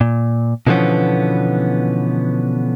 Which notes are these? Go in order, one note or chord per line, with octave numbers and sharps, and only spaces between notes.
A#2
B2 D3 E3 F3 B3 C#4